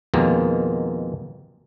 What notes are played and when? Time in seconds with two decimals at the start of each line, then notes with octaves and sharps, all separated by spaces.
0.14 F2 B2 D#3 G#3 A#3